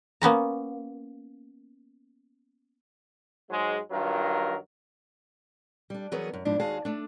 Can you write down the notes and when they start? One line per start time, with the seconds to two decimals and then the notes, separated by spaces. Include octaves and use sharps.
0.22 A#3 B3 C#4 A#5
3.50 G#2 F#3 G#3
3.91 G2 D#3 F#3 F4 A#4
5.90 G3 D4
6.12 E3 F#3 B3 G#4 A#4 C#5
6.33 F#2
6.45 F2 G#2 F3 B3 D4
6.59 D#2 G#3 F#4 G#4 F5 A5
6.85 A3 D4